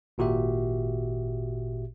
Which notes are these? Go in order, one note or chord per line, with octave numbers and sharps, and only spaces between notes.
G#1 A#2 F#4 G4 E5